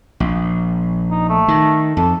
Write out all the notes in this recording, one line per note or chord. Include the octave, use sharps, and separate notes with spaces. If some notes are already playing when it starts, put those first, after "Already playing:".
A#1
D#4
A3
D#3
F2 A4